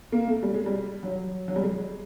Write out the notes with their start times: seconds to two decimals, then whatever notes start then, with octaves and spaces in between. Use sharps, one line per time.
0.12 A#3
0.28 A3
0.43 G3
0.54 G#3
0.66 G3
1.03 F#3
1.48 F#3
1.56 G3
1.64 G#3